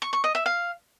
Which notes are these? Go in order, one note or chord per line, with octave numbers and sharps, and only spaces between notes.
C#6
C#6
D#5
E5
F5